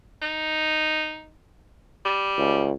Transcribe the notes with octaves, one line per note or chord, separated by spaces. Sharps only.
D#4
G3
C#2